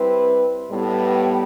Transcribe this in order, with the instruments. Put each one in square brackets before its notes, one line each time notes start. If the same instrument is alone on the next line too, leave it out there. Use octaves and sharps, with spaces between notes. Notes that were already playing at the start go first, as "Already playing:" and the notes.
Already playing: [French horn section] G3 C4 E4 B4
A2 G3 B3